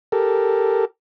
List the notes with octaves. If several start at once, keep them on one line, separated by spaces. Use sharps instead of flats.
G4 A4 A#4